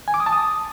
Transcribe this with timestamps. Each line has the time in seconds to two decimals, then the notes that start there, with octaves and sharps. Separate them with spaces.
0.08 G#5
0.14 D6
0.20 D#6
0.26 A5
0.33 D#6